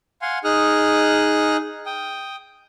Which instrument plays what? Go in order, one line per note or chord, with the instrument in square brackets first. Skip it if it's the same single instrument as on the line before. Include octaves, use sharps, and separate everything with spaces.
[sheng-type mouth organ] F5 F#5 G#5 C6
D#4 G#4 D#6 F6 F#6
G5 D#6